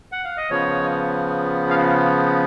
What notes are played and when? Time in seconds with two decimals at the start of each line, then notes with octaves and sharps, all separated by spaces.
0.12 F#5
0.24 F5
0.37 D#5
0.50 C#3 F3 B3 C#5
1.70 F5